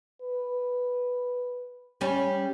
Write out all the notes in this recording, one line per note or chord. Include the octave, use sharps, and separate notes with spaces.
B4
G3 C#4